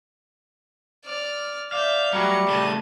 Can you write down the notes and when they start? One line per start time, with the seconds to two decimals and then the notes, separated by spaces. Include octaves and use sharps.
1.06 D5 F6
1.72 D5 E5 F5 G6
2.13 F#3 G3 A3 C#7
2.48 C#3 A3 A5 D#7